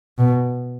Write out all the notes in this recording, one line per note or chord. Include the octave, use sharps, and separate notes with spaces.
B2